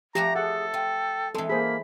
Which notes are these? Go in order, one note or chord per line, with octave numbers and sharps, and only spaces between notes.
F3 A3 F#4 G4 A#5
G#4 A4 F#5
F4 G5
E3 G#3 C4 A4 C6
A#3 G#4 C5 B5